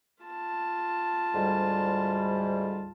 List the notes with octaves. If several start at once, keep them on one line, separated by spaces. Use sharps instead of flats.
F4 A5
D2 G#2 G3